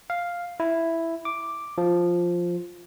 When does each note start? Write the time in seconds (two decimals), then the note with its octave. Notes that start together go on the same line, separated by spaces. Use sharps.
0.10 F5
0.60 E4
1.25 D6
1.78 F3